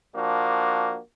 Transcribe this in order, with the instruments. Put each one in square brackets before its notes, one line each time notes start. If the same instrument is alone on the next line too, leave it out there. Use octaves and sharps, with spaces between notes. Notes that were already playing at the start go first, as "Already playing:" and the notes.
[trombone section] F3 A#3 D4 F#4